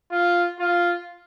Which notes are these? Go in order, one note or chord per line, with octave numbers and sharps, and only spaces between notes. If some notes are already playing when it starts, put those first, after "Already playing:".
F4
F4